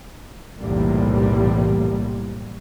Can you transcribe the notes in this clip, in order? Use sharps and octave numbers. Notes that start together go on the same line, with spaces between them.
B1 E2 A2 C3 G3 A#3